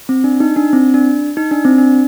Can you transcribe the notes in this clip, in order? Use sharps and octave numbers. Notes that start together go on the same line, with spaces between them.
C4
D4
D#4
D4
C4
D4
D#4
D4
C4
D4